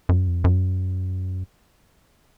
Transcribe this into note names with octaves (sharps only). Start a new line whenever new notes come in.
F#2
F2
F#2